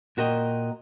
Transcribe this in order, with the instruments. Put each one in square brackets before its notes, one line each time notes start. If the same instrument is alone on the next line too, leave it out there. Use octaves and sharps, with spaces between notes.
[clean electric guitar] A#2 F#4 A#4 D#5 G5